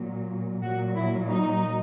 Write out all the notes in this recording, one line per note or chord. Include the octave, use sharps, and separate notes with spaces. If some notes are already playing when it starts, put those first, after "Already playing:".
Already playing: A#2 F#3
A#2 F#3 F#4
E4
D#4